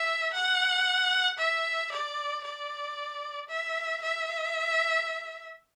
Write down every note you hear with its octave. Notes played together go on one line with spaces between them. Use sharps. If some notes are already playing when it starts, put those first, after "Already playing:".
Already playing: E5
F#5
E5
D5
D5
E5
E5